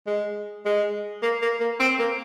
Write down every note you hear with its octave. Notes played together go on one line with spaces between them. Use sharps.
G#3
G#3
A#3
A#3
A#3
C4
A#3